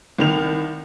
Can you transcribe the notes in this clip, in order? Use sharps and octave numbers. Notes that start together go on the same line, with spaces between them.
C2 D#3 F7